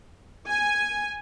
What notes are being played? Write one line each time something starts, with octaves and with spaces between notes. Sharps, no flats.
G#5